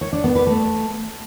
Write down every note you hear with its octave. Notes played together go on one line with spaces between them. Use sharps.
C#5
D4
B3
B4
A3